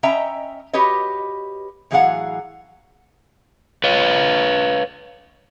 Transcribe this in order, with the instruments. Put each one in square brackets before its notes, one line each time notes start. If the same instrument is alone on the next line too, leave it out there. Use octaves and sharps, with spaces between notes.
[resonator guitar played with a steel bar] C#4 D#5 E5 G5 A#5
F#4 G4 B4 C#5 D#5
A2 E3 F#3 G#4 F5 F#5
[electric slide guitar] B4 C#5 F5